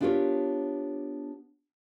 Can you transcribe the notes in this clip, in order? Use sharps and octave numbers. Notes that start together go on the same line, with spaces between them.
B3 D4 F4 G4 A#4 C#5